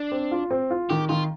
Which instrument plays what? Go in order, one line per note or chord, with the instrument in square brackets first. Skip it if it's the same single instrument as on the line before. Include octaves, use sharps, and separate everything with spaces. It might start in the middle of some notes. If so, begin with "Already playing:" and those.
Already playing: [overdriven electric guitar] D4
[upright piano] C4
F4
C4
F4
[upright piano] D#3 [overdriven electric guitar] G4
[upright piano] D#3 [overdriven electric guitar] F4